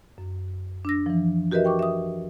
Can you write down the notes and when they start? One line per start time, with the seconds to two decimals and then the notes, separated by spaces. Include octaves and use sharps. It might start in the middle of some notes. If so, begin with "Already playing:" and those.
0.18 F#2
0.85 D4 E6 A#6
1.06 E3 F3
1.51 F#4 G4 A#4 B4 D#5 E5
1.65 G5 C#6 D6
1.79 E5 D#6